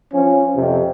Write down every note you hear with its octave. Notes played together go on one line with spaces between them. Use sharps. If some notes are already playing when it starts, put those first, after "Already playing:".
F3 C#4
F2 C3